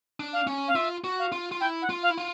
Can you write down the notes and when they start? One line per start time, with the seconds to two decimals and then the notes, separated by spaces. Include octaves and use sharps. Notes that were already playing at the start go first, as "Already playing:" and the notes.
0.20 D4
0.33 F5
0.47 C#4
0.68 F5
0.75 F4 E5
1.04 F#4
1.19 F5
1.32 F4
1.52 F4
1.60 E4 G5
1.82 F#5
1.90 F4
2.03 F5
2.10 E4
2.18 F4